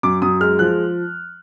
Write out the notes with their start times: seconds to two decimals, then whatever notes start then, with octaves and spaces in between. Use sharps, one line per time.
0.03 F#2 D6
0.22 F#2 D#6
0.41 G#3 F6
0.59 F3 F#6